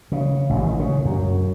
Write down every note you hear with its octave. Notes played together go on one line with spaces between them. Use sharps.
C#3
A1
D#3
C#3
F#2